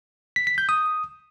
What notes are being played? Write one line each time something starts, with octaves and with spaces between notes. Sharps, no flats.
B6
B6
G6
D#6